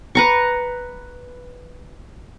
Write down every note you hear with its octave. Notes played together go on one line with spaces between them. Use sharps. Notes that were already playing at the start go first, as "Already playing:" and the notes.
B4 A#5 C#6